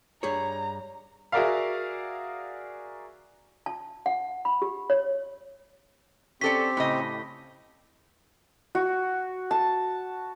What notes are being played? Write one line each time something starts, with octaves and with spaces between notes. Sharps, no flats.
G2 G#4 C#5 A#5
F#4 G#4 A#4 D5 E5 F5
A5
F#5
B5
G4
C#5
C4 C#4 G4 A4 D5 B6
A2 C#3 D#5
F#4
A5